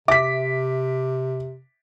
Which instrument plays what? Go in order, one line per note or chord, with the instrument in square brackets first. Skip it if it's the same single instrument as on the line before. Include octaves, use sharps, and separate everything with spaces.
[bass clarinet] C3 [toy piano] E5 [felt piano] D6 B6